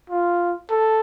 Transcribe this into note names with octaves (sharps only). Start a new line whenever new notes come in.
F4
A4